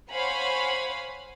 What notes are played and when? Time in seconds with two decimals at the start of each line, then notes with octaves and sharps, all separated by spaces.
0.11 C5 C#5 F5 F#5 G#5 B5